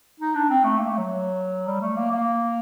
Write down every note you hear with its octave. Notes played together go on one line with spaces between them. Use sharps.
D#4
D4
C4
A3
A#3
A3
F#3
G3
A3
A#3
A#3